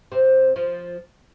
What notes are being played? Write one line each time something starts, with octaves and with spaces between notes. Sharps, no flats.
C3 C4
F3 F4